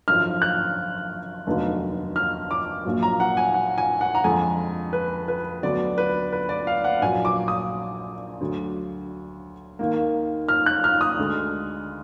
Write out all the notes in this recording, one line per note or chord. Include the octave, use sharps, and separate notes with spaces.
G#1 F#2 D3 F3 F6
F#6
F1 D#2 D3 F#3 B3
F6
D6
A#1 A#2 F#3
A#5
F#5
G#5
F#5
G#5
F#5
A#5
F2 D3 G#3 G#5
B4
B4
D2 D3 F#3 B3 D5
B4
B4
D5
F5
F#5
A#1 A#2 F#3 G#5
D6
D#6
D2 D3 F#3
D#2 D#3 A#3
F6
F#6
F6
D#6
D2 D3 G#3